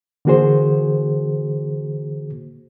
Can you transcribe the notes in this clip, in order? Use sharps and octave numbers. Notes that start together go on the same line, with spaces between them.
D3 E3 A#3 F#4 G#4 C5